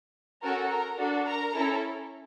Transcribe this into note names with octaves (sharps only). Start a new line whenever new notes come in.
C#4 F#4 A4 A#4 A#5
A#4 A#5
D4 F#4 A4
A#4 A#5
C#4 E4 A4